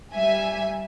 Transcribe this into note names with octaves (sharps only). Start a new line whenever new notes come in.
G3 E5 G#5